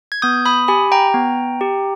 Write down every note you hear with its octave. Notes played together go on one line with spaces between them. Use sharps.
G#6
B3 D#6 G6
B5 D#6
G4 G#5 B5
G5 A#5
B3
G4